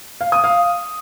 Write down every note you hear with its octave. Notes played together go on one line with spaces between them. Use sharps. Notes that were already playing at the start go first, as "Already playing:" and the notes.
F5
D#6
F5